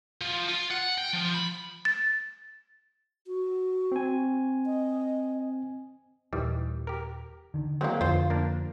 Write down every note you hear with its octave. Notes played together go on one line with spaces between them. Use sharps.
F3
F4
F#5
G5
F3
B5
A6
F#4
C4 G#5
D#5
D#1 D#3 E3 G3
G4 A#4
D3 D#3
F#3 G#3 A#3 C4 E4
F2 D3 F4 C5
A#3 D4 A#4